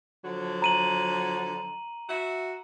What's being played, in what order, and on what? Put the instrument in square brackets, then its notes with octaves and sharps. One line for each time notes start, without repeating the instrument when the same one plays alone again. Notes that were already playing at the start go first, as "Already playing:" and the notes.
[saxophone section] D3 F3 F#3
[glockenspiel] A#5 D#7 F#7
[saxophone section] F#4 E5